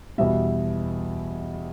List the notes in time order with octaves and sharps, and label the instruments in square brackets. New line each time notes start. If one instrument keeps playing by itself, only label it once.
[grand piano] E2 B2 G3 E5